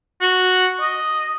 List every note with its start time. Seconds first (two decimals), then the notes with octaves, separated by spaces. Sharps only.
0.21 F#4
0.80 D#5